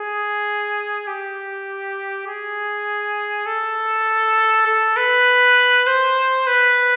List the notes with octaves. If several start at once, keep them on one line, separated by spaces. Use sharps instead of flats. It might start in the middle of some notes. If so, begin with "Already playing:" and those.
Already playing: G#4
G4
G#4
A4
A4
B4
C5
B4